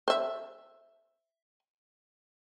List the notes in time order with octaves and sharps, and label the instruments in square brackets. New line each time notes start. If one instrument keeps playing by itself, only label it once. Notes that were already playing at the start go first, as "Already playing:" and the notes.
[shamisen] C5 E5